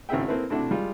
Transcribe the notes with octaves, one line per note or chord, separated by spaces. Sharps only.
G#1 C#3 E4 G#4 E5 G5
A#3 C4 E4 A4 B4
C3 A3 D4 E4 F#4
G3 G#3 F4